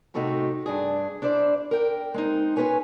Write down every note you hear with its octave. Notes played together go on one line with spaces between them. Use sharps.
A2 C3 A3 D#4 F#4 G4
G2 D4 G#4
D4 E4 C5 D5
A#4 G5
G#3 C4 D#4
C#4 F4 F#4 B4 C#5 G#5